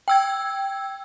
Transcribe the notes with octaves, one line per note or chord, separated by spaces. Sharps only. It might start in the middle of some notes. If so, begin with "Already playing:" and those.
G5 E6 G#6